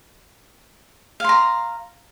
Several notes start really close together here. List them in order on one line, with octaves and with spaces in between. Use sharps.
F5 C6 A#5